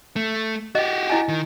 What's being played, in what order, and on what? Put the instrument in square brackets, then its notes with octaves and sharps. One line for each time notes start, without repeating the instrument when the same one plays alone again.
[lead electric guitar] A3
[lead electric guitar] F#4 G4 [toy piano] D#5
[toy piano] E4 D#5 G#5
[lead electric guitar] D#3